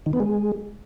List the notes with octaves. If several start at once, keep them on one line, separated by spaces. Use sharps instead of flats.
D#3
B3
G#3